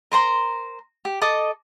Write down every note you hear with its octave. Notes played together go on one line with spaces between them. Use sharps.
A#4 C5 A#5 C6
G4
A4 D#5 D6 D#6